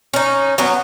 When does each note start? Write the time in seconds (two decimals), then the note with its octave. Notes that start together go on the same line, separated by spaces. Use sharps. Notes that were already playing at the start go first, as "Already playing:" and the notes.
0.13 C#4 D#4
0.58 F#3 B3 C#4